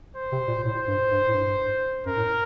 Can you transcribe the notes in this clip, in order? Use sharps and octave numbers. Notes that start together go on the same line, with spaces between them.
C5
C3
A#2
A#2
A2 C5
G2
G2
A2
G2
F#2 A#4
A2